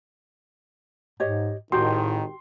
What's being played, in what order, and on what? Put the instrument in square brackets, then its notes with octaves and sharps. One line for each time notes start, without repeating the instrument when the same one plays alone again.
[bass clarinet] G#2 [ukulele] G4 C#5 D#5
[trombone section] G#1 D#3 [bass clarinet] A2 [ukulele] F#4 G4 [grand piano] C6